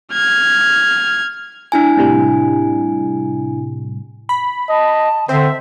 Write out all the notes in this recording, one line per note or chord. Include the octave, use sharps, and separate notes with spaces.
F6 G#6
D4 E4 G#5
A2 C3 G3
B5
D#5 A5
D3 C4 C5 E5